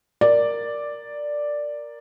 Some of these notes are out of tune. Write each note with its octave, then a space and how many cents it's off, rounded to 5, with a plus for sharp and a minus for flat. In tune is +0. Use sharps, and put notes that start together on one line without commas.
A#4 +0 D5 +0